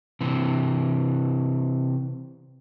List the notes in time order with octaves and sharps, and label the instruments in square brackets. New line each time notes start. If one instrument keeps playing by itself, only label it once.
[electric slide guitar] C3 E3